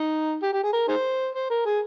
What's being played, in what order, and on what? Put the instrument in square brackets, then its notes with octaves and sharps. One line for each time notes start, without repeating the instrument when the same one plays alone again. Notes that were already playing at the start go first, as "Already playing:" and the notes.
Already playing: [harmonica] D#4
G4
G4
G#4
A#4
D#4 G#4 C5
C5
A#4
G#4